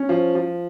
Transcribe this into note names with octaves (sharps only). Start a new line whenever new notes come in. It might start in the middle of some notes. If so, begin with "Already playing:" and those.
Already playing: C#4
F3
F3